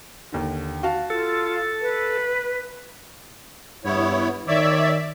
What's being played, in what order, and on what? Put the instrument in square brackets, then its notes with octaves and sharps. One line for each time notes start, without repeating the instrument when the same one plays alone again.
[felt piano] D#2 D3
F#4 F5 A5
[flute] F4 [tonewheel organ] A4
[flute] B4
[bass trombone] G2 [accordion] B3 E4 C#5
[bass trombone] D#3 [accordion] C#5 [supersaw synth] D5 E5